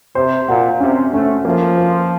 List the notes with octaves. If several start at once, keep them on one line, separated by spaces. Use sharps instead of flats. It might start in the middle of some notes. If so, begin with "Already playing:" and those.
C3 C5
A#2 F#4
C3 C#4
A3 C#4
F3 A#3
A#3